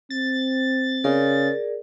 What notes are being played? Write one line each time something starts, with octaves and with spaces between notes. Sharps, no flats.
C4 A6
C#3 G#4 A#4 D5